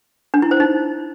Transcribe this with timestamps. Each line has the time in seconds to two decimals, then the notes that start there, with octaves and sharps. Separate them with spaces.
0.34 D4
0.42 E4
0.51 C5
0.60 D#4